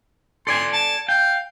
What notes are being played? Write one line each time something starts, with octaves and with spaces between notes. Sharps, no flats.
A4 D5 G#5 C6
A5
F5 G5